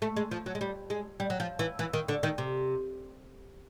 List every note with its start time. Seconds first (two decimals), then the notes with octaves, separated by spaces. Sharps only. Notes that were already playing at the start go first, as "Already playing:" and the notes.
0.02 A3
0.17 G#3
0.31 F3
0.46 F#3
0.55 G#3
0.61 G3
0.90 G#3
1.20 G3
1.30 F#3
1.40 F3
1.59 E3
1.79 E3
1.93 D#3
2.08 D3
2.23 D#3
2.38 C3